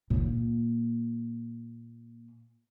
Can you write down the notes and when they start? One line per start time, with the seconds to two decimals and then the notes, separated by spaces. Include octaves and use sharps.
0.10 A#2 A#3